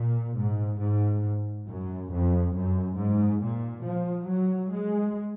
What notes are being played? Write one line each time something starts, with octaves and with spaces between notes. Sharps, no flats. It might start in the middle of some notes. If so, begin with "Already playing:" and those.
Already playing: A#2
G#2
G#2
F#2
F2
F#2
G#2
A#2
F3
F#3
G#3